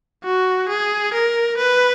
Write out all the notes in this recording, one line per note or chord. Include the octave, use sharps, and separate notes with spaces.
F#4
G#4
A#4
B4